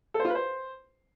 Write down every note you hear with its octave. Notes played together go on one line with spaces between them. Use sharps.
A4
C5
F4
B4
C5